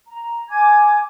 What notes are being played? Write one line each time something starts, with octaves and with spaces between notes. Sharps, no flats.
A#5
G#5 D6 G#6